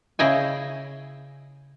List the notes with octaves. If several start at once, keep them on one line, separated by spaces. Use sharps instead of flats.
C#3 E4 G#4 D#5 G5 G#5